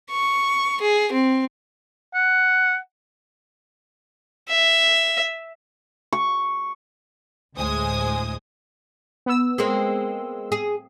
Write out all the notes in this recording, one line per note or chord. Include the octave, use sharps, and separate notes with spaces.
C#6
G#4
C4
F#5
E5
C#6
D2 A2 G#3 C5 G#5 D#6
B3 E6
G#3 A#3 C4
G#4